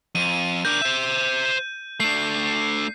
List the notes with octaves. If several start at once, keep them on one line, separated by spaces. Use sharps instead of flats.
F2 D#7
D4 A#4 G6
C5 E5
A3 D4 C7